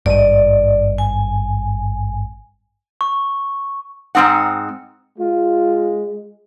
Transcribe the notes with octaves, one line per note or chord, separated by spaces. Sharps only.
G#1 G2 D5 D#5
G#5
C#6
G#2 F3 C4 D#4 F#5
G#3 F4